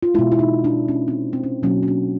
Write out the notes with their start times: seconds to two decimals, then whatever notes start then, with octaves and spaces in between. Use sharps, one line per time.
0.03 F4
0.14 B2 G#3 E4
0.32 E4
0.39 D#4
0.64 D4
0.88 C#4
1.08 C4
1.33 C4
1.44 C#4
1.63 B2 F#3 A#3 C#4
1.83 C#4
1.88 D4